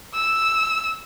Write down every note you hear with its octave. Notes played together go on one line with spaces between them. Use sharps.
E6